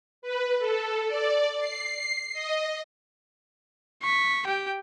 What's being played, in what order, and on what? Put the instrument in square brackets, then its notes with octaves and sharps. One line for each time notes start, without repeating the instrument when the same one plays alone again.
[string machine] B4
A4
D5
C7
D#5
[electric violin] C#6 B6
G4 G5